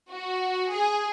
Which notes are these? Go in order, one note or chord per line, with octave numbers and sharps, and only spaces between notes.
F#4
G#4